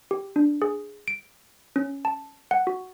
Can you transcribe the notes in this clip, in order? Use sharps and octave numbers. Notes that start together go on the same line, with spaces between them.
G4
D4
G#4
D7
C#4
A5
F#5
F#4